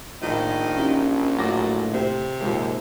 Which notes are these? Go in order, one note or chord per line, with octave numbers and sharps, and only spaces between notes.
A#1 A2 D#3
C#4 D#4 E4 G4
A2 F#3 D6 A6 A#6
C3 C4 G4
D#2 A#2 G#3